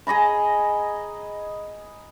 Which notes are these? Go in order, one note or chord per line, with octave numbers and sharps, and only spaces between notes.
G#4 D#5 A#5 B5